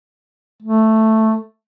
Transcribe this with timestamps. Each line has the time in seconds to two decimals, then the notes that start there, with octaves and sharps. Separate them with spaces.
0.63 A3